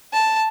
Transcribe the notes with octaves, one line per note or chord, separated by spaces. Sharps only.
A5